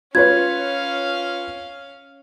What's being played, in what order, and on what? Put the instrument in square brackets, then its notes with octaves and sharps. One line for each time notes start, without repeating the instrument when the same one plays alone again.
[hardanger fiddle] C#4 F5 [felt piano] F4 B4 C#5 [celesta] G#6